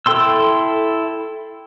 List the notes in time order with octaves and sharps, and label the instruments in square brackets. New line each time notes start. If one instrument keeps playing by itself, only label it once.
[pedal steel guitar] E4 A4 G5 C6 E6